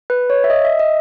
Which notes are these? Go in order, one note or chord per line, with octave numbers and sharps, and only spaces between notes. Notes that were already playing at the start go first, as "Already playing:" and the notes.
B4
C#5
E5
D#5
E5
D#5